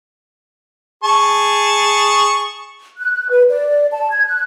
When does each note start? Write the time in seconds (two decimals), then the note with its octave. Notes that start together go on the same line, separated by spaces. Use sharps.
1.04 G#4 A5 C#6
2.98 F#6
3.30 B4
3.50 D5
3.92 A5
4.12 G#6
4.25 F#6